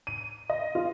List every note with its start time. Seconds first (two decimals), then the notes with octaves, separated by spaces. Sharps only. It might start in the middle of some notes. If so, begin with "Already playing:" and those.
0.07 D#7
0.50 D#5
0.75 F4